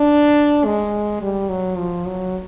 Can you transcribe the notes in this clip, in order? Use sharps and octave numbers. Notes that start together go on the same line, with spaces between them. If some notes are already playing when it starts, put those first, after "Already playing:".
Already playing: D4
G#3
G3
F#3
F3
F#3